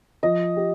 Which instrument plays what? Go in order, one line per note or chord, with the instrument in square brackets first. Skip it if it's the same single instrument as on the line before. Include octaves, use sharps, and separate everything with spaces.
[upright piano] F3 [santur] D#5
[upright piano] G4